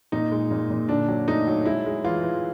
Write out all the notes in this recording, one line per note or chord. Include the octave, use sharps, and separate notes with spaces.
A#2 D#4
G#3
A#2
A#2
D3 D4
F#3
A3 D#4
F#3
G#3 E4
G#3
E3 F4
E3